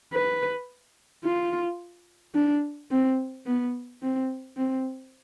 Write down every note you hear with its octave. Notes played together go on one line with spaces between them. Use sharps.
B4
F4
D4
C4
B3
C4
C4